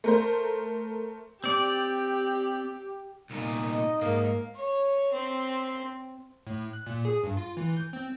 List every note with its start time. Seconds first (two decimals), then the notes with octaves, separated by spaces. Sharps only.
0.04 A3 A#4 C5
1.44 C4 G4 D5
3.30 C2 A#2 D#4
3.66 D#5
4.01 G#2 A#3
4.55 C#5
5.13 C4
6.47 A2
6.73 F#6
6.86 A#2
7.05 G#4
7.24 G2
7.37 F4
7.57 E3
7.77 G6
7.93 C4